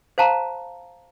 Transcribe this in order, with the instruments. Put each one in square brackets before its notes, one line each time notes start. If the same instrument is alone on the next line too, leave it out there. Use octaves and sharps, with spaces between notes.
[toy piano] C5 F5 A5 A#5